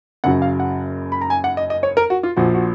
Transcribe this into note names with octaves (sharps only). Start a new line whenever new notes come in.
F#1 F#2 C#3 F#3 F#5
F5
F#5
B5
A#5
G#5
F#5
D#5
D#5
C#5
A#4
F#4
F4
A#1 A#2 F3 F#4
F#4